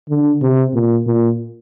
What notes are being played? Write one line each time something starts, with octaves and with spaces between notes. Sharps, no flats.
D3
C3
A#2
A#2